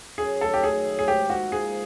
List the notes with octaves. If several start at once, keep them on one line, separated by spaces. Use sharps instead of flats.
F#2 G#4
D#3 F#3 A3 A4
G4
F#2 G#4
D#3 F#3 A3
G#4
G#2 G4
F3 A#3 D#4 F#4
G#2 G#4